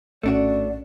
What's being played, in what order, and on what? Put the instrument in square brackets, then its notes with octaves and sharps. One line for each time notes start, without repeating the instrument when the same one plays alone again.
[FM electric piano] A#1 A2 C#4 [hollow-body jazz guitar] A3 D4 F#4 [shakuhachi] D5